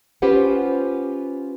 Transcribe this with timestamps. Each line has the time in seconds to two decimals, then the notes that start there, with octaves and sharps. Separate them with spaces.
0.22 C#4 F4 G4 B4 C5 F#5